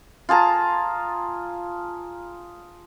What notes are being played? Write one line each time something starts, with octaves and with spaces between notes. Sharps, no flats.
F4 G#4 A5 A#5